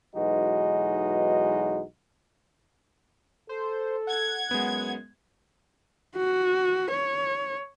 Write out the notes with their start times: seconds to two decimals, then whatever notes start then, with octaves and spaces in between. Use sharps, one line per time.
0.16 B1 E3 G#3 D#4 F#4
3.49 A4 C5
4.07 F#5 G#6
4.51 F#2 G#3 B3
6.17 F#4
6.91 C#5